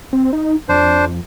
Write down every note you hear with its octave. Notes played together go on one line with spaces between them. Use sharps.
C4
D#4
F2 D4 C5